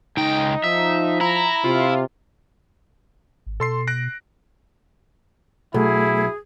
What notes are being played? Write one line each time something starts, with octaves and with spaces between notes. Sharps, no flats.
C#2 D#4 G5
F3 E5
E4 A#5
C3 F4
G#1
B2 A4 C6 C7
F#6 A#6 D7
B1 A3 E4 G#4